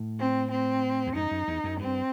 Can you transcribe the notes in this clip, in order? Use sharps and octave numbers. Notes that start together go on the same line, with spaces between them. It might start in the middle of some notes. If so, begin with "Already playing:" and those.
Already playing: A2
C4
C4
E2
F#2 D#4
F#2
E2
F#2
G2 C4